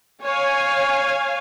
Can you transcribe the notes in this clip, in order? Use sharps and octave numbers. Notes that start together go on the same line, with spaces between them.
C#5 F5 G#5